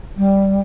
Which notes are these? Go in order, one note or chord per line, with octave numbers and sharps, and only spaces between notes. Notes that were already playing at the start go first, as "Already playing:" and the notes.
G3